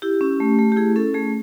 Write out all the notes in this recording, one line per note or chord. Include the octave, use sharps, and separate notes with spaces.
E4 G4
C#4
A3
A3
G4
E4 G#4
C#4 A4
A3 G#4